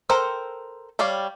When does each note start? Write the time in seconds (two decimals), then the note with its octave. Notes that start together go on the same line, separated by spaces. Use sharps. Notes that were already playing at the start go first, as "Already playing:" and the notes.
0.09 A4 A#4 C5 G5
0.99 G3 C#5 D5 F5